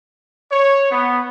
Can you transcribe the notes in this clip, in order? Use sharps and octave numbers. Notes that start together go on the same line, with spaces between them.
C#5
B3